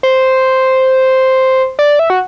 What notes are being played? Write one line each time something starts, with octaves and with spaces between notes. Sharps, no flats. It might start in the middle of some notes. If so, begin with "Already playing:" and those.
C5
D5
E5
F#4